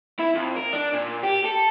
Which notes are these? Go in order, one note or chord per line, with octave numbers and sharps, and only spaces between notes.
E4
F2
A#4
D4
A#2
G4
A4